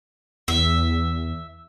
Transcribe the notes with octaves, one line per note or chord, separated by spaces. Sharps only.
E2 E5